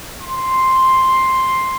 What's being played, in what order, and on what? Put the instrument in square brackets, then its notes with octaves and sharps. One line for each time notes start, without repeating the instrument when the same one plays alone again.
[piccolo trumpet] C6